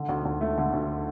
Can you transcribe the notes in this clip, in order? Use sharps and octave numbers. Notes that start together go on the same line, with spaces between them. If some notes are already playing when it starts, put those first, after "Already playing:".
Already playing: D3
D2
D2
A3
D3
D2